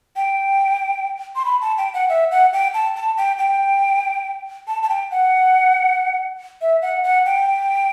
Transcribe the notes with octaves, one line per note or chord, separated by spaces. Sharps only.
G5
C6
B5
A5
G5
F#5
E5
F#5
G5
A5
A5
G5
G5
A5
A5
G5
F#5
E5
F#5
F#5
G5